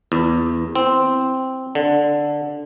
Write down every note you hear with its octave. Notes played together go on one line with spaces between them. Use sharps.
E2
C4
D3